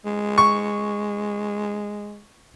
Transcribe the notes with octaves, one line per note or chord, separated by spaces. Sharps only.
G#3
C#6